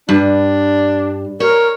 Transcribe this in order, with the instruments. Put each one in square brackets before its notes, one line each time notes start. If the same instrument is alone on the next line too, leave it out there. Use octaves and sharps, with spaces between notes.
[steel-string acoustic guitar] G2 [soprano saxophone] D4
[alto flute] A#4 [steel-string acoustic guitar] C#5